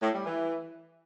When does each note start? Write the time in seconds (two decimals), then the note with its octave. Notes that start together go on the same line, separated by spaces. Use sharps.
0.03 A2
0.14 G3
0.26 E3